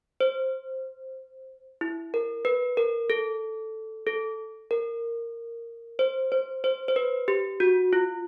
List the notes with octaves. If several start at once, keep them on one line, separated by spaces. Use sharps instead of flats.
C5
E4
A#4
B4
A#4
A4
A4
A#4
C5
C5
C5
C5
B4
G4
F#4
F4